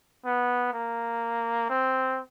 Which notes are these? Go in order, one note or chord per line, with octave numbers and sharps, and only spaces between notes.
B3
A#3
C4